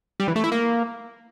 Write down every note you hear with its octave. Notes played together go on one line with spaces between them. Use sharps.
G3
E3
A3
E4
A#3